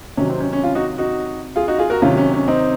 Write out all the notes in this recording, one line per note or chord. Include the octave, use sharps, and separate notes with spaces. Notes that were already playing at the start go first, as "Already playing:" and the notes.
C3 D#3 F#3 C#4
C4
C#4
C#4
C#4 F4
D#4 F#4
D#4 F#4
F4 G#4
D#4 F#4
F4 G#4
F#4 A#4
C3 D#3 F#3 C#4 F4
C#4
C#4
C4 D#4